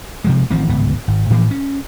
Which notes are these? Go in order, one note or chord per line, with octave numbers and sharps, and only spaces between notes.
C3 F3 G#3
A1 D#3 F3 C4
D1 G#1 C#2 B3
G#1
A2 E3 F3 A#3
C#4